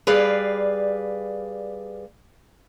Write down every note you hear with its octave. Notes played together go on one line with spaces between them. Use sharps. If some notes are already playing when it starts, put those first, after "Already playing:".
G3 G#4 B4 D5 F5